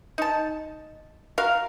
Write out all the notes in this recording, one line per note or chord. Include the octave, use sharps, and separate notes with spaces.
D#4 A5
F#4 A#4 F5